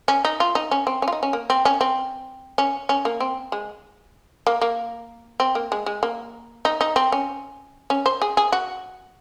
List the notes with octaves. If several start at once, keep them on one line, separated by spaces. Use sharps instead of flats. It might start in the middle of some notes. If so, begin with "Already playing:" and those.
C#4
D#4
F4
D#4
C#4
C4
C#4
F4
D#4
C#4
A#3
C4
C#4
C4
C#4
C#4
A#3
C4
G#3
A#3
A#3
C4
A#3
G#3
G#3
A#3
D#4
D#4
C4
C#4
C#4
C5
G#4
G#4
F#4